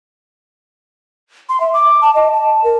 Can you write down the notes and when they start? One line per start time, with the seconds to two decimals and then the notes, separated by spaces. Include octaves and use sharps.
1.49 C6
1.60 E5
1.74 D6
2.02 A5
2.15 D#5
2.33 A5
2.64 A#4